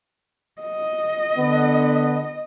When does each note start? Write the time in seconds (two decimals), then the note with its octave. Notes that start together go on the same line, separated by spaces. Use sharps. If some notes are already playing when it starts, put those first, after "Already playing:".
0.62 D#5
1.37 D3 B3